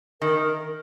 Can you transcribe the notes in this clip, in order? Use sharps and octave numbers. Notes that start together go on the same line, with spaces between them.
D#3 A#4